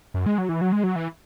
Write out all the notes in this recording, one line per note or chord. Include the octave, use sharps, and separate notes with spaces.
F#2
G#3
F#3
E3
F#3
G#3
F#3
E3